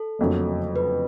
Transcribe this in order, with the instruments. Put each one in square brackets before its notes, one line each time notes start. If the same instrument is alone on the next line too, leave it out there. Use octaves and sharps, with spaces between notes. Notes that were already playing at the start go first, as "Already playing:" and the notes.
Already playing: [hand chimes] A4
[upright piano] F#1 F2 D3 F#3 A3
[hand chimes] B4